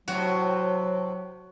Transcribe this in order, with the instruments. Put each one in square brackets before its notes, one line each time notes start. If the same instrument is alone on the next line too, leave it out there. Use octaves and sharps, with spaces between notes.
[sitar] A2 C3 [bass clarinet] F#3 [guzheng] F#4